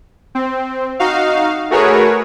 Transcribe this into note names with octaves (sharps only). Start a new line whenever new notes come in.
C4
D#4 F#4 F5
A3 F#4 G#4 A#4 B4 C#5